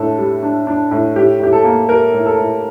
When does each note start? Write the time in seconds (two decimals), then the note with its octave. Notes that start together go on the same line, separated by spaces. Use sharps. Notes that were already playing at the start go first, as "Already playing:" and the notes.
Already playing: A2 D4 A4
0.18 G3
0.43 D4
0.67 D4
0.91 A2
1.16 A2 G4
1.40 A2 G4
1.53 A4
1.64 A#3
1.89 G3 A#4
2.13 A2
2.25 A4
2.38 A2